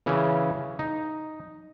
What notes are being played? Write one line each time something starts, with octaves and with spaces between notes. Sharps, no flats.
C#3 E3 C#4
D#4